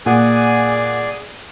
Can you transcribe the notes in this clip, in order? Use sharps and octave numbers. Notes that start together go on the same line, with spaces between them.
A#2 G#4 D5 F#5 G#5